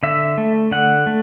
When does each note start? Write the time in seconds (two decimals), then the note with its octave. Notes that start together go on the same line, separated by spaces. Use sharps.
0.03 D3 E5
0.38 A3
0.71 D3 F#5
1.06 A3